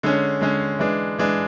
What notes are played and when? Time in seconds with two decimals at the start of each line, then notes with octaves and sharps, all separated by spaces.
0.03 D3 G#3 C#4
0.41 D3 G#3 C#4
0.79 E3 G#3 D4
1.18 E3 G#3 D4